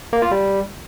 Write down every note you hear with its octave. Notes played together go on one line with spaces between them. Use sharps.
A#3
F4
G3